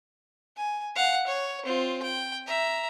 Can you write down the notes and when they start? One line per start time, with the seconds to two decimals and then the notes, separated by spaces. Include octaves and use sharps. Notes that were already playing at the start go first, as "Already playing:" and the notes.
0.57 G#5
0.96 F5 F#5
1.27 C#5
1.65 C4 F4
2.03 G5
2.47 E5 A#5